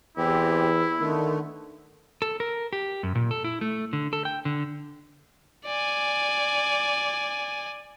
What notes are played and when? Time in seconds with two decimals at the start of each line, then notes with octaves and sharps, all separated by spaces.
0.17 E2 C4 E4 G4
1.00 D3 D#3 A3 B3
2.22 A4
2.40 A#4
2.73 G4
3.03 F#2
3.15 A#2
3.31 A4
3.44 E4
3.61 A3
3.93 D3
4.13 A4
4.25 G5
4.45 D3
5.66 D5 G#5